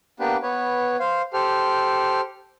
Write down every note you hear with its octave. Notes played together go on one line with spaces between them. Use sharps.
A#3 B3 D4 G4 B4
B3 B4 C#5
C5 F5
G4 A4 C5 F6